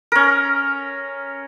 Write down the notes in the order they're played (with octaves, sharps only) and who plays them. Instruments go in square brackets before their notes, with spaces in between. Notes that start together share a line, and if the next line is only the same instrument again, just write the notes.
[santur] C#4 A#4